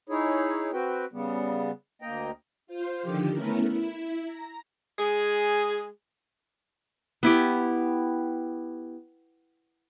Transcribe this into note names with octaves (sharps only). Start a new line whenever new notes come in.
D#4 E4 G#4 C#5
C4 F#4 B4 G5
C#3 G3 B3
D2 A#3 D#5 G5 A#5
F4 C5
D3 D#3 F3 G4
A3 B3 C#4 E4 A#4
E4
A#5
G#3 G#4
B3 E4 G4